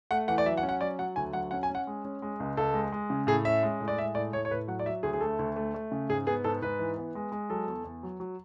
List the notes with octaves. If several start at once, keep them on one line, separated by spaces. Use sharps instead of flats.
A3 F#5
E3 F#5
D5
F#3 E5
F#5
C#4
F#5
F#3 D5
F#3 F#5
D2 G#5
F#3 F#5
C#4 F#5
G#5
C#4
F#5
G#3
C#4
G#3
C#2
C#2 A4
G#3
G#3
C#3
A2 G#4
C#4 E5
G#3
A2
D5
G#3 E5
A2 D5
A2 C#5
C#5
A2 B4
F#3 F#5
D5
F#3 E5
D2 G#4
G#4
A3 A4
D2
A3
A3
C#3
G#2 G#4
B3 G#4
G#2 A4
G#2 B4
E3
B3
G#3
G#3
F#3 A4
E2
E2
F#3
F#3